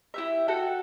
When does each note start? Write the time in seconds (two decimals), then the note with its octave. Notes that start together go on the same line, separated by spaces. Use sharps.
0.14 E4 G4 E5
0.48 F#4 A4 F#5 G5